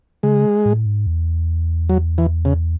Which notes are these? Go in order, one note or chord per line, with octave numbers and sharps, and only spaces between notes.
C#3 G#3
A2
G#2
E2
F#3
E3
C#3